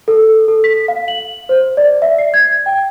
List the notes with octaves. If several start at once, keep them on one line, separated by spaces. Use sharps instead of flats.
A4
A4
B6
F5
F#7
C5
D5
E5
C7
G#6
G5